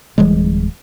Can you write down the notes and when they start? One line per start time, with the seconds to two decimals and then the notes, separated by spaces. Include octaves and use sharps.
0.18 D1 E3 G3 G#3